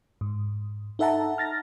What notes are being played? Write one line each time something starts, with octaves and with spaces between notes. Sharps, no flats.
G#2
D#4 A4 E5 F#5 A5 A#5
F6 A6 A#6